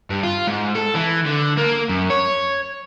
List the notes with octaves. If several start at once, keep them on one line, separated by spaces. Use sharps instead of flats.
G2
F4
G#2
A4
E3
D3
A#3
F#2
C#5